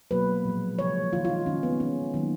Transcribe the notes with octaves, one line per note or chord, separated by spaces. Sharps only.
B2 F#3 A#3 B4
A#2 F3 G#3
C#3 F3 G#3 C#5
D#3 A#3 F4
F4
D#4
D#3 G#3 C#4
B3
D#3 G#3 C#4
D#3 F#3 A#3